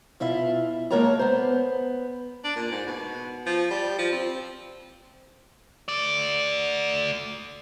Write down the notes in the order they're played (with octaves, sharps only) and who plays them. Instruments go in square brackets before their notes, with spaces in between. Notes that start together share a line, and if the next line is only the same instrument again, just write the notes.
[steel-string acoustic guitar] B2 E4 F4 E5
G#3 A#3 A#4 C#5 A5 A#5
B3 C5
[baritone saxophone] D4
A#2
G#2
B2
F3
G3
F3
C4
[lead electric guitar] A3 D5